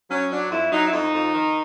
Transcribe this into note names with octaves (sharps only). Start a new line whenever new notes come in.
F#3 C#4
F#3 D4
F2 E4
F#3 D#4
E4
F2 D#4
F2
D#3